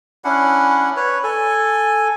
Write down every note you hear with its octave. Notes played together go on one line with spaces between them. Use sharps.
C#4 D4 E4 F#5
B4 C#5
A4 G#5